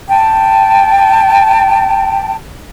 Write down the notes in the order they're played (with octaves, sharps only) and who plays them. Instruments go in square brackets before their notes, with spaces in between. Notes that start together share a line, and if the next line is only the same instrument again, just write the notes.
[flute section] G5 A5